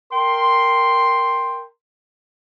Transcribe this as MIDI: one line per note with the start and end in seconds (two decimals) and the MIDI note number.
0.13 1.64 70
0.13 1.64 79
0.13 1.64 84